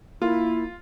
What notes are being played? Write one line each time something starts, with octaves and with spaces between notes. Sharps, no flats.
A#3 E4 F4